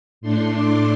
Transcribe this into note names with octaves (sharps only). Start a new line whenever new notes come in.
A2 A3 D4 C6
D6